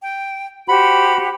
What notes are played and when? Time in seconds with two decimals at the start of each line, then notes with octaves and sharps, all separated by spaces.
0.01 G5
0.68 F#4 G4 C5 B5